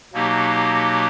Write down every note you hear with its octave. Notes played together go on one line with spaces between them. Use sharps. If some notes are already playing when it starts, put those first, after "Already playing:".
B2 F#3 A#3 D#4 G4